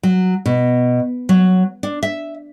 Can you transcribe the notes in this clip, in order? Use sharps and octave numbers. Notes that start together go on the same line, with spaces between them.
F#3
B2
F#3
D4
E5